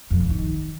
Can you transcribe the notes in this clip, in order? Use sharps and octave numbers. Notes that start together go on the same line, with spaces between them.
F2
G2
D#3